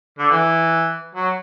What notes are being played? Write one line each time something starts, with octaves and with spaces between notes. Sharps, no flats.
D3
E3
F#3